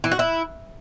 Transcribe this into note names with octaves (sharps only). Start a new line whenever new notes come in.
E3
F#4
E4